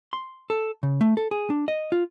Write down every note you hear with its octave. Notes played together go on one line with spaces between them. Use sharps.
C6
A4
C#3
A3
A4
G#4
D4
D#5
F4